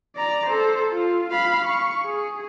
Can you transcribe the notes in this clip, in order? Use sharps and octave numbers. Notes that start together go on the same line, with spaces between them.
D5 A#5
A4 C5
F4
F5 B5
C#6
G#4